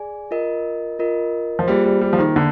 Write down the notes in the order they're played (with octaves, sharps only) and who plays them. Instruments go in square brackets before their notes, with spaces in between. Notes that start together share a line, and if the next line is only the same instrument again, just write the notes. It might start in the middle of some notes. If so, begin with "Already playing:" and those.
Already playing: [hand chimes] G#4 D5 G#5
F4 A#4 D#5
F4 A#4 D#5
[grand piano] F3
[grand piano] G3 [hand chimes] A#3 F4 G#4 C5
[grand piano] G3
G3
F3
D#3
[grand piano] D3 [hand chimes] A#3